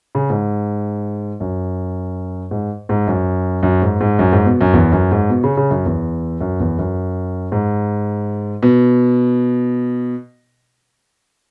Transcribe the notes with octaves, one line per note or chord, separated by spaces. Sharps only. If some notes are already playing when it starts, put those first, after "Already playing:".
C#3
G#2
F#2
G#2
G#2
F#2
F#2
G#2
G#2
F#2
G#2
B2
F#2
E2
F#2
G#2
B2
C#3
C#3
F#2
E2
F#2
E2
F#2
G#2
B2